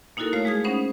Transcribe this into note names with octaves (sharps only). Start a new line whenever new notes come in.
A#3 D#4 E4 F#4 A4 A#4
A3 C#5 F5 F6
G#3 G#4 D#6 G#6
C#4 D#4 C5 F#5 B5